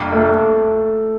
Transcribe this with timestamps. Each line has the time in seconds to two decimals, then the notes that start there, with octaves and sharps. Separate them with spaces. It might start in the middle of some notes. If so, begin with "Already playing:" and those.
Already playing: F2 C3 G3 A#3 D4
0.12 A3